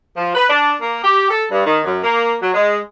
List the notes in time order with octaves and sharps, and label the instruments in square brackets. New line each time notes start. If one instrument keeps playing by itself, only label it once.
[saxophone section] F3
B4
D4
A#3
G4
A4
G2
D#3
F#2
A#3
F#3
G#3